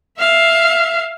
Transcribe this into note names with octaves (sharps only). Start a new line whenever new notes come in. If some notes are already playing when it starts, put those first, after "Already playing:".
E5 F5